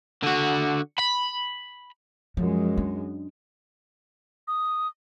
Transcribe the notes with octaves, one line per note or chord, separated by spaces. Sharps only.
D3 F#4
B5
F#2 F3 G#3
D4
D#6